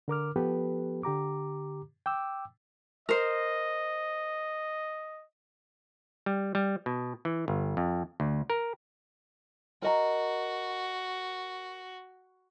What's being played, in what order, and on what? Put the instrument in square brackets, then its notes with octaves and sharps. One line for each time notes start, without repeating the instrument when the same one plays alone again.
[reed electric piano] D3 A#4 D6 F6
F3 B3 G4 A4 B4
D3 G4 A#5 D6
G5 D6 E6
[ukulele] A#4 C5 [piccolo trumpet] D#5
[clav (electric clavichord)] G3
G3
B2
E3
G1
F2
D2
A#4
[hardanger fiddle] F#4 [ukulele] A#4 D#5 A#5